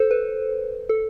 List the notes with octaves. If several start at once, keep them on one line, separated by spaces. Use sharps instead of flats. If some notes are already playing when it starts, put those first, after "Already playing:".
Already playing: A4 C5
B4
A4